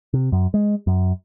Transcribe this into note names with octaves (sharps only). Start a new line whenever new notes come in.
C3
F#2
G#3
F#2